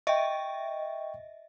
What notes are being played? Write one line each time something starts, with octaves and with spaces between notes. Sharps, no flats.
D#5 E5 G5 C#6